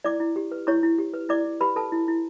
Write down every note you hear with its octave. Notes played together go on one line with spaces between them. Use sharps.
E4 D5 D6
E4
G4
B4
E4 C#5 C#6
E4
G4
B4
E4 D5 D6
E4
G4 B4 B5
A4 B4 A5
E4
E4